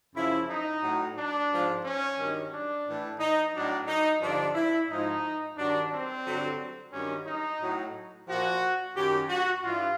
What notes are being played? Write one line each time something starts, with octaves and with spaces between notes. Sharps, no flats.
F#2 C#3 F3 E4
D#4
A2 F#3
D4
G#2 F3
C#4
G2 D#3 F#3
D4
A2 E3
D#4
A2 F#3 D4
D#4
G2 D3 F3 D4
E4
G#2 F3 D#4
G2 D#3 F#3 D4
C4
G2 D3 F#3
G2 D#3 F#3 C#4
D#4
A2 F#3
A#2 F3 F#4
F#2 D#3 F#3 G4
F#4
G2 E3 F4